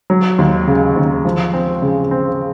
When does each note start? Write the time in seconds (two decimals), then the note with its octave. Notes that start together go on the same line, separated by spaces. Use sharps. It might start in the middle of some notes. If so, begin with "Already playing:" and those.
0.10 F#3
0.38 D#2
0.67 C#3
0.96 D#2
1.25 F3
1.54 C4
1.82 C#3
2.11 C4